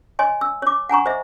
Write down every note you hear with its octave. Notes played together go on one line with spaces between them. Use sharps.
C#5 D#5 G#5 C6
E6
C#5 D6
F#5 G#5 A#5 C#6
C5 D#5 E5